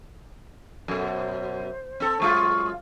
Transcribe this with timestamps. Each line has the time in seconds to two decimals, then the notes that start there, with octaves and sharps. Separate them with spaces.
0.88 F#2 B2 A4
1.10 C5
2.00 C4 A4
2.20 F#2 G#3 F4 C#6